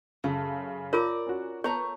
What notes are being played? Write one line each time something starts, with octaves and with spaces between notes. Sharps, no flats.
F#2 C#3 A3
F4 A#4 C#5 D5 A#5
C#4 F#4
A3 B3 C#5 A#5 C#6